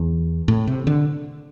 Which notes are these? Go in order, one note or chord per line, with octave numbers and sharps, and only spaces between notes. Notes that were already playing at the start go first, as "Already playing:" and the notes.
Already playing: E2
A2
C3
D3